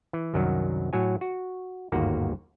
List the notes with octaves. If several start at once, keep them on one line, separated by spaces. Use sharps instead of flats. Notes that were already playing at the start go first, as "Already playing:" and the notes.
E3
C2 F#2 D#3 F#3
A2 F#3 F#4 C#5 G#5
F#4
G1 D#2 G#2 A#3 F#4